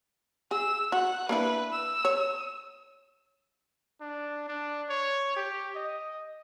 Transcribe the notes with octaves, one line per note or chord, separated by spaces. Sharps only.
G#4 E6
F#4 F#5
A#3 D4 E4 B4
E6
C#5
D4
D4
C#5
G4
D#5